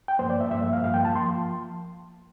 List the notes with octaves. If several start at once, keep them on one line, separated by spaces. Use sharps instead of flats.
G5
G2 F3 A#3 C5
D5
E5
G2 F3 A#3 E5
E5
F5
G2 F3 A#3 F5
G5
A5
F3 A#3 C6